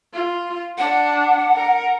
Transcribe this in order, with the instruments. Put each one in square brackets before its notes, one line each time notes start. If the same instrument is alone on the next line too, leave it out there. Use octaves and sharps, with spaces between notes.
[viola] F4
[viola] D4 [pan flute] F#5
[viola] A#4